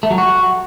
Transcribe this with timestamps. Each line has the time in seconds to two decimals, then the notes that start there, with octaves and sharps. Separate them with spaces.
0.03 A3
0.11 F#3
0.18 F#4